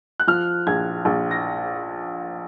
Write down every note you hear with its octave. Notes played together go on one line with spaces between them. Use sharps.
F#6
F3 F6
A#1 G#6
A#1
A#6